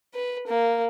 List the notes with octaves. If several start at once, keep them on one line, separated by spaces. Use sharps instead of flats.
B4
A#3